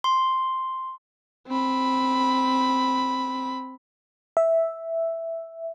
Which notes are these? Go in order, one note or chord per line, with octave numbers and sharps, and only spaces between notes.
C6
C4 B5
E5